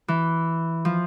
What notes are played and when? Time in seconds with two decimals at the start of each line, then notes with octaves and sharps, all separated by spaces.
0.08 E3
0.85 F3